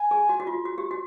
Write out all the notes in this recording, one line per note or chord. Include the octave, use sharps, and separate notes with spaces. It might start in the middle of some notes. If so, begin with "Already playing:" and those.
Already playing: G#5
G#4
F#4
F#4
F4
F#4
G4
F#4